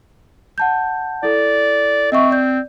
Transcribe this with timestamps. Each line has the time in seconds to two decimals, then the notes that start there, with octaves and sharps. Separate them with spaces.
0.58 F#5 A5 G6
1.23 E4 A4 D5
2.12 C4 D#5 E5 C#6
2.31 D5 G6